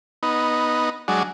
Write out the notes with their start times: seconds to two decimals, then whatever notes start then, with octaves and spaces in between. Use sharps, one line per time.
0.23 B3 D#4
1.08 F#3 G#3 D4